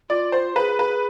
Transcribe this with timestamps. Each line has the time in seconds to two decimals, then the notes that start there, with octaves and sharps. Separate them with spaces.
0.09 F4 D5
0.32 C5
0.56 G#4 B4
0.79 B4